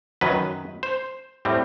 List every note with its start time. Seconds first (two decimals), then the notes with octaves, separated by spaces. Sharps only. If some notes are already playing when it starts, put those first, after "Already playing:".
0.21 F#2 D#3 F#3 B4
0.83 C5
1.45 A2 G3 C4